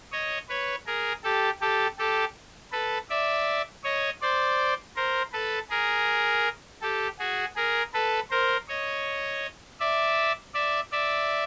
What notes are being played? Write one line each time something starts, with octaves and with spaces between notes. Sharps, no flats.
C#5 D#5
B4 C#5
G#4 A#4
G4 A4
G4 A4
G4 A4
A4 B4
D5 E5
C#5 D#5
C5 D5
A#4 C5
A4 B4
G#4 A#4
G4 A4
F#4 G#4
G#4 A#4
A4 B4
A#4 C5
C#5 D#5
D5 E5
D5 E5
D5 E5